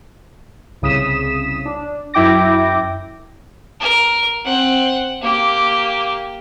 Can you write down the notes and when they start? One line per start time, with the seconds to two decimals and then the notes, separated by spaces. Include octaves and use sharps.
0.82 C2 C#3 D#6 B6 E7
1.66 D4
2.14 F#2 E4 G5 D6 A#6
3.80 A#4
4.44 C4 F#5
5.22 A#3 G4